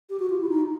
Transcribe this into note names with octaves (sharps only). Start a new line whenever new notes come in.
G4
F#4
F4
E4
D#4